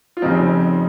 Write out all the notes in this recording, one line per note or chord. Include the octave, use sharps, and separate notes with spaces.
F4
F1 F2 C#3 C4 D#4